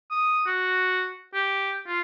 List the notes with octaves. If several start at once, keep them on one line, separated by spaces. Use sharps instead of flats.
D#6
F#4
G4
F4